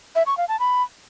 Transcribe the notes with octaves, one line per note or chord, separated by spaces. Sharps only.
E5
C#6
F5
A5
B5